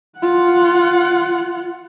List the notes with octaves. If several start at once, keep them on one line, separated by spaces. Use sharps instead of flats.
F4 F#5